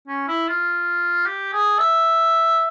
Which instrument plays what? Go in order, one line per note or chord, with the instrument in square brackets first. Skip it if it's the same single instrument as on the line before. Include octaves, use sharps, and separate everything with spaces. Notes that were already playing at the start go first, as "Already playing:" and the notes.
[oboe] C#4
E4
F4
G4
G#4
E5